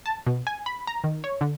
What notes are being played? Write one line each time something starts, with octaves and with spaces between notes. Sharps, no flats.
A5
B2
G#5
B5
A#5
D#3
C#5
D3